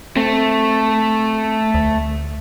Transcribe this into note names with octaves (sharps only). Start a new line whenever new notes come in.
A3 C4
D2